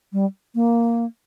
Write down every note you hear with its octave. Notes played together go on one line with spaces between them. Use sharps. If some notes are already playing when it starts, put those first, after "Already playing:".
G3
A#3